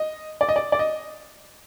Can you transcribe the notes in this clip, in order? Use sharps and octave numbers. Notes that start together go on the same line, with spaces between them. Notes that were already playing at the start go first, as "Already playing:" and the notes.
Already playing: D#5
D5
D#5
D5
D5
D#5